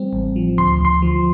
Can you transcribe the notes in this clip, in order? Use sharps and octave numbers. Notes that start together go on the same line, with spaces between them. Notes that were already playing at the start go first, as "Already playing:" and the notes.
Already playing: G3 C4
A1
F3
D2 C6
D2 C6
F3